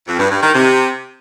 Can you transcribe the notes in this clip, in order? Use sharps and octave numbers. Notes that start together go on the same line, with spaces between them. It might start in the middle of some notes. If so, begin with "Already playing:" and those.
F2
G2
G2
D#3
C3